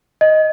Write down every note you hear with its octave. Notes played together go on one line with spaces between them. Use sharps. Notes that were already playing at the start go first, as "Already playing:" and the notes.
D#5